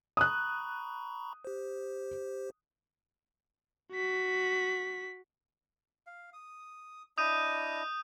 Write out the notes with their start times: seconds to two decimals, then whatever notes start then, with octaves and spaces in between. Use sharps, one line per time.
0.17 A#5 B5 C#6 D#6 F#6
1.45 G4 C5
3.92 F#4 B6
6.07 F5
6.33 D#6
7.18 D4 E4 D#5 D#6 G6 D#7